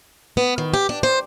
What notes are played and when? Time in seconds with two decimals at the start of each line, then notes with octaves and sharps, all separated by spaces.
0.37 B3
0.58 D#3
0.74 G4
0.89 D4
1.03 C5